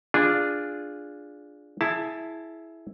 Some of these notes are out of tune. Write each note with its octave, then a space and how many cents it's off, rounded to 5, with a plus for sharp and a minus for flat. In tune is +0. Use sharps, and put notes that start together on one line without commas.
D4 +0 F4 +0 G#4 -5
E4 +0 G#4 +25 A5 +15